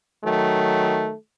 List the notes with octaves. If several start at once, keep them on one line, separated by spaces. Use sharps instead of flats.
D#3 F#3 A3